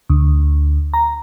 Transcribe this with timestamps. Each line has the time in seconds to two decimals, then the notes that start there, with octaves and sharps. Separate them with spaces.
0.10 D2
0.94 A#5